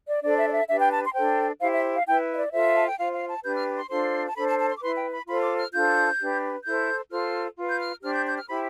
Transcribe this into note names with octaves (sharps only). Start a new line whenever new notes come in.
D5
D4 A4 C5 D5
E5
D5
E5
D4 G4 B4 E5
G5
A5
C6
D4 A4 C5 G5
E4 G4 C5 F5
E5
F5
E4 B4 G5
E5
D5
F4 A4 C5 E5
A5
G5
F4 C5 F5
F5
A5
D4 G4 B4 G6
F6
C6
D4 F4 A4 C5 C6
A5
D4 A4 C5 B5
A5
A5
C6
D6
E4 B4 C6
G5
B5
F4 A4 C5 B5
D6
F6
D4 F4 A4 C5 G6
D4 G4 B4
E4 A4 C5 G6
F4 A4 C5 F6
F4 B4
G6
F6
D4 G4 C5 F6
G6
G6
F6
E4 G4 C5 B5